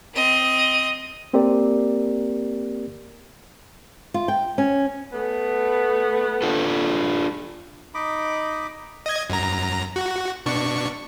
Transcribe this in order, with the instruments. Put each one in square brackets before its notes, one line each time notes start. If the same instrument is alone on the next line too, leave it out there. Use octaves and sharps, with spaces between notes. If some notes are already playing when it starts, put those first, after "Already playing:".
[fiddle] C4 D#5
[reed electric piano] A#3 C4 G4 A#4 D5
[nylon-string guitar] F4
G5
C#4
[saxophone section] A3 B3
[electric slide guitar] D4 F4 A4
[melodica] D#4 D#5 B5 D6
[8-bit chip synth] D#5 G#6
F#2 A#5
F#4
B2 D4 C#6